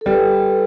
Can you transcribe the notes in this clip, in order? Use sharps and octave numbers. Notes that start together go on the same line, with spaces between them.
A4
G3 B4